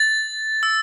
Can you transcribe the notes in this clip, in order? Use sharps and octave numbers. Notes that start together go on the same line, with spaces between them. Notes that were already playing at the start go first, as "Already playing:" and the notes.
Already playing: A6
E6